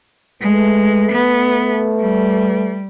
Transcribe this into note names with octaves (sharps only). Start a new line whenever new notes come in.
G#3 A3 B4
B3
G3